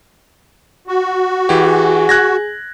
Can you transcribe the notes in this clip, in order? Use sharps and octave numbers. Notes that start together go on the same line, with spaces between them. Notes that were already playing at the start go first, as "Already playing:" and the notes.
F#4
E3 G4 G#4
F#6 G#6 A#6